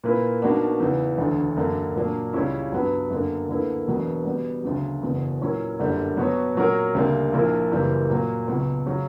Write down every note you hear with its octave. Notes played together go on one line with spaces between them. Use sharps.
A#2 A#3 E4 B4
B1 B2 A#3 D4 F#4
E2 C#3 E3
E1 D2 D3
F#2 D3 A#3 D4
A#2 F#3 A#3 D4
C#2 C#3 G3 C#4 E4
G2 F#3 B3 F#4 B4
F#2 D3 A#3
D2 D3 A#3 E4 B4
E1 E2 B2 F#3 A#3
B2 G3 B3
D2 C#3 F#3
F#1 E2 B2
A#2 F#3 C#4 E4 A#4
G1 F#2 D3 G3 A#3
B2 F#3 B3 F#4 C#5
A#2 F#3 C#4 F#4 A#4
D2 C#3 G3 A#3
A#1 A#2 A#3 E4 A#4
F#1 F#2 E3 G3 A#3
A#2 F#3 A#3
C#2 B2 F#3
C#3 F#3 C#4